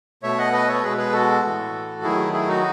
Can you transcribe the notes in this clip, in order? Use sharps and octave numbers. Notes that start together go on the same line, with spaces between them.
B2 A3 C#5 E5
D#5 F#5
B4 D#5
A4 C#5
B2 G#3 G#4 B4
G#4 B4
F#4 A4
A2 E3 A3
D#3 F#3 A3 E4 G#4
E4 G#4
D#4 F#4